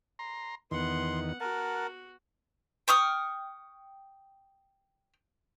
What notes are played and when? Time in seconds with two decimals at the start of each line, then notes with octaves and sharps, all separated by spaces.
0.19 A#5 C6
0.71 E2 D#3 B3 F#5 C6
1.40 F#4 A#4 F#5 A5
2.88 G5 C#6 D#6 F6